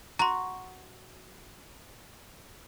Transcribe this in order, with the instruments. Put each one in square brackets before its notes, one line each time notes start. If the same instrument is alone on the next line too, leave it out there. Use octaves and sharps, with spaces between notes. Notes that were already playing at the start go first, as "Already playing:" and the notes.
[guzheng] F#4 [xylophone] A#5 C6